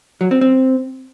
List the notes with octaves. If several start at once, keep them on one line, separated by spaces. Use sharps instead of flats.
F#3
C4
C4